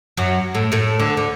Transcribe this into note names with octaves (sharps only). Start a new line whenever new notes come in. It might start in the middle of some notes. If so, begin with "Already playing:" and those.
F#2 F#3
A2 A3
A2 A3
D2 D3
D3